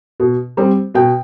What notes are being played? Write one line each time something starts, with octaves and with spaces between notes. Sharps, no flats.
B2
G3 C4
B2 G5